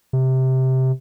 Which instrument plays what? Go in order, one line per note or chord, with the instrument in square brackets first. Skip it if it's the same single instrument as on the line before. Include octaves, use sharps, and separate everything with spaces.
[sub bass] C3